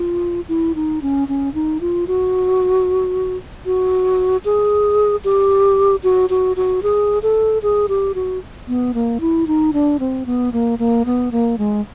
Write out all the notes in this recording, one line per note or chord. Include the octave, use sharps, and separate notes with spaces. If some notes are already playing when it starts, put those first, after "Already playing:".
Already playing: F4
E4
D#4
C#4
C#4
D#4
F4
F#4
F#4
G#4
G4
F#4
F#4
F#4
G#4
A4
G#4
G4
F#4
B3
A#3
E4
D#4
D4
C4
B3
A#3
A#3
B3
A#3
G#3